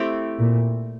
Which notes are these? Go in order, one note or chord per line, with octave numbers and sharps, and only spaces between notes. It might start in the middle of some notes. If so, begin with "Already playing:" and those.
Already playing: A3 C4 E4 G4
A#2